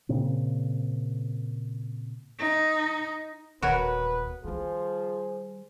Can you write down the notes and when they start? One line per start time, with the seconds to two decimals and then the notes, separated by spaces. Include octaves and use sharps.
0.09 A#2 C#3 C4
2.39 D#4
3.62 D#1 A1 B3 F#4 A#4 B4 C#5
4.44 D#3 F3 G3 G#4 C5